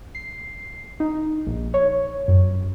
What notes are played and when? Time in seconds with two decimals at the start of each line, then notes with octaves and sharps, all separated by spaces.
0.15 C7
1.00 D#4
1.47 A#1
1.74 C#5
2.28 F#2